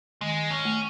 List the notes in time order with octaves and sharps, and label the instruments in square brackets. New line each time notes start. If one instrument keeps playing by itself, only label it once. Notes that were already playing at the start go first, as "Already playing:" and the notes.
[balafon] D#3 [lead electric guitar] G#3
[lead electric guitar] C#4
[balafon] A3